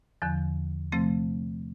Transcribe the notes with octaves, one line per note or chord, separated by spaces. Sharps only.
E2 D3 F3
C3 F3 A3 C4